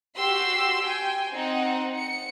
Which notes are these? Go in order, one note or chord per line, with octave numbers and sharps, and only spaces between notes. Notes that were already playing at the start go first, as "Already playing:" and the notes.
F#4 G4 C6 E6
G5 G#5
C4 D#4 F#5
C#7